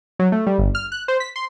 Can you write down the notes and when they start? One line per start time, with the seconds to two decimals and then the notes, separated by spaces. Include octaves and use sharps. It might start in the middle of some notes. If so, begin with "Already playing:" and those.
0.19 F#3
0.32 A3
0.47 G3
0.58 G1
0.75 F6
0.92 F#6
1.08 C5
1.20 B6
1.36 C6